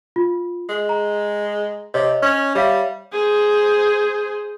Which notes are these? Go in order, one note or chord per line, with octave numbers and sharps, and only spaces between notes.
F4
G#3
A#5
C3 C#5 D#5
C#4
G3 C#5 E5 F5
G#4 C5